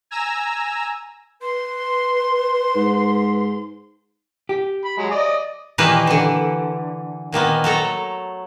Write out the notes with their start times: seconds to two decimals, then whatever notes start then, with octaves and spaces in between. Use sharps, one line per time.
0.11 G#5 A#5 E6
1.42 B4 C6
2.76 G#2
4.49 G4
4.85 B5
4.98 F#3 G#3
5.11 D5 D#5
5.78 A#2 D#3 E3 A#3 G4 B4
6.07 D3 E3
7.32 A#2 D#3 A#3 B3
7.64 F#3 A3 A4 A#5